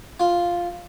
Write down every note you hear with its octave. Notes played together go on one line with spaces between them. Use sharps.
F4